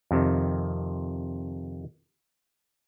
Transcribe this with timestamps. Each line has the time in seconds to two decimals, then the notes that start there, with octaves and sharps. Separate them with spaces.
0.11 F2 C3 D#3